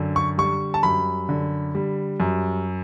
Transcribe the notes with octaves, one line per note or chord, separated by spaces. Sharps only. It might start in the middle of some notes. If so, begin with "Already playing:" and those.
Already playing: F#2 D3
C#6
G3 C#6
A5
F#2 B5
D3
G3
F#2